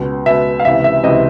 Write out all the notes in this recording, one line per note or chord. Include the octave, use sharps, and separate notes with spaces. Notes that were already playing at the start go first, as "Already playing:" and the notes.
Already playing: C#2 B2
C#2 B2 E5
F5
C#2 C3 E3 E5
E5
C#2 C3 E3 D#5